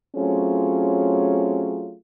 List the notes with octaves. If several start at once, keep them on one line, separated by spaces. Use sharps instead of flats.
F#3 A3 C4 C#4 F4 G#4